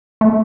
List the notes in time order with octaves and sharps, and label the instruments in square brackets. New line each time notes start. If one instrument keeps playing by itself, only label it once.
[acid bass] A3